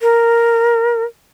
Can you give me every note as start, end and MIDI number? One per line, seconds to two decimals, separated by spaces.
0.01 1.03 70